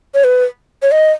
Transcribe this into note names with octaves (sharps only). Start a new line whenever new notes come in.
C#5
B4
C#5
D#5